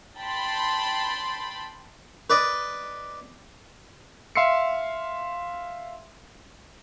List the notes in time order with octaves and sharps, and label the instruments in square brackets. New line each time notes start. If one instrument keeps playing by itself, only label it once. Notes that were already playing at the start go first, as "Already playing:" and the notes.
[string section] G5 A5 B5 C6
[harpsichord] B4 D5 D#5
[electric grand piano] E5 F5 C6 E6 C7 C#7